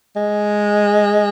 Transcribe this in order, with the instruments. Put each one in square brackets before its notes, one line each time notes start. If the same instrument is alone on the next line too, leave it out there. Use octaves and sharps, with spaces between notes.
[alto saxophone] G#3